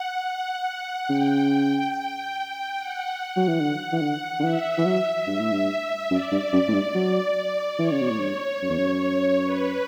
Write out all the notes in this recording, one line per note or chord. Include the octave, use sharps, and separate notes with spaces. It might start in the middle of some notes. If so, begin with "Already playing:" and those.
Already playing: F#5
C#3 G5
F#5
F#3
E3
D3
E3
D3
D3
E3 E5
E3
F#3
G2
A2
G2
F#2 D5
G2
F#2
A2
G2
F#3
E3 C#5
C#3
B2
A2
G2
F#2
E2
F#2
B4